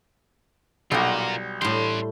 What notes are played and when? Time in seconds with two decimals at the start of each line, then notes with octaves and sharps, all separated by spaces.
0.91 B1 G3 F4 F#4 A#4
1.61 A2 G3 A4 C6